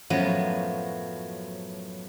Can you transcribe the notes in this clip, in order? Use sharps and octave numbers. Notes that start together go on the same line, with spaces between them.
F#2 A2 F3 F#3 B3